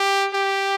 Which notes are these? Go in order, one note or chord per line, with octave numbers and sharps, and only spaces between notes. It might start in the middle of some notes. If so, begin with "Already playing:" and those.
Already playing: G4
G4